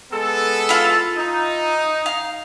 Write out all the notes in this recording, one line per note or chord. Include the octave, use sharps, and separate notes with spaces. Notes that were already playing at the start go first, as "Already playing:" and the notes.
G#3 B3 A4
E4 F4
D#4
F5